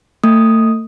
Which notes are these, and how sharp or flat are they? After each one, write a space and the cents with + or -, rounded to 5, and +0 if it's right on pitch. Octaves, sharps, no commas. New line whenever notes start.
A3 +30 D#6 +0